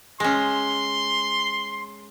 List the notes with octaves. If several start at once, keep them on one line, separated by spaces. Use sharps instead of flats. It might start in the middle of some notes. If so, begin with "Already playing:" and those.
G#3 C#4 C6